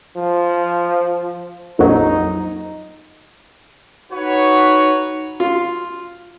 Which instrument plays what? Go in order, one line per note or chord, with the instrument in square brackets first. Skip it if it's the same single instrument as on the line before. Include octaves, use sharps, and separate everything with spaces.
[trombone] F3
[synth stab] A#1 F2 F#3 [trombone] D#4
[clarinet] D#4 [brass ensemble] F#4 B4 C#5
[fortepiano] F4